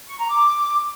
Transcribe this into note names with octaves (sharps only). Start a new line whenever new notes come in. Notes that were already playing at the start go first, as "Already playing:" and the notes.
C#6
A#5
D6